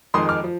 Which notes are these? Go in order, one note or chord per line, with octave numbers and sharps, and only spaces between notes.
F2 D#3 G#3 C6 D#6
D6 F6
F3